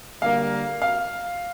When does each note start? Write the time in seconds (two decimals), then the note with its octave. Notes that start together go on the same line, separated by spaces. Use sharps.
0.21 D3 G3 A#3 F5
0.82 F5